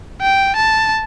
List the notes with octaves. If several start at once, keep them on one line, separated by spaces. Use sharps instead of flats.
G5
A5